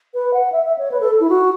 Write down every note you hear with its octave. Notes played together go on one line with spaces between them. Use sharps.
B4
F#5
E5
E5
C#5
B4
A4
E4
F#4